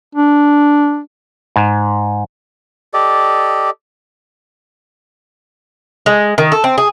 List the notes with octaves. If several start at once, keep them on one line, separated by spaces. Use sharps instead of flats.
D4
G#2
G4 A4 D5 D#5
G#3
D#3
A4
C4
G#4